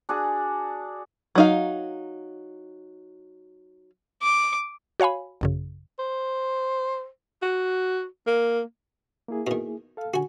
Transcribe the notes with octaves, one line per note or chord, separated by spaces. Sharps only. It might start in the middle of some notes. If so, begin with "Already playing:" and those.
D4 F#4 G#4
F#3 D#4 F5
D6
F#4 C#5 F5 G#5 B5
A1 F#2 C#3
C5
F#4
A#3
A#3 E4 G#4
B2 D#3
A4 F5
D3 F#4 G#5